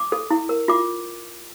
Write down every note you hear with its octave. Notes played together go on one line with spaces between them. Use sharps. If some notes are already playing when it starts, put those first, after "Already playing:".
Already playing: D6
A4
E4
A#4
F4 D6